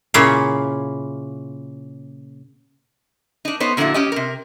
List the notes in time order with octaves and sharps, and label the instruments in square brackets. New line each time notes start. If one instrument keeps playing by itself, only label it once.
[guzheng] A#2 C#3 E4 C#5 E5 F5
[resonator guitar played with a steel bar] D4 D#4
B3 D#4 C5 C#5
A#2 D3 F3 D#4 E4 F#4
C#4 G4 D#5
C3 A#4